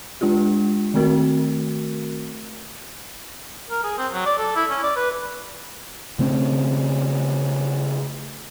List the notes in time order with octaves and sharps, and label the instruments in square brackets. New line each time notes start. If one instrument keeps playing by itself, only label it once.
[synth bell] G#3 D4 F4 G4
D#3 A3 C4 F#4 A#4
[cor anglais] A#4
G#4
C4
F#3
D5
A4
E4
C#4
D5
B4
[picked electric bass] C#3 A3 C4 C#4